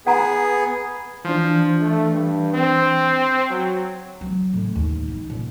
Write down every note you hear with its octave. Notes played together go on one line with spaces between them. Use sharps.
B3 G#4 F#5 A#5
E3 F3 D4
A3
G2
C4
F#3
F#3
A2
D#2
D#4
A#2